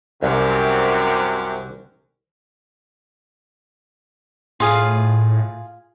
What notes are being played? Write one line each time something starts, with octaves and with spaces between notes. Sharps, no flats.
C2 F#2 C3
A2 F4 G#4 F5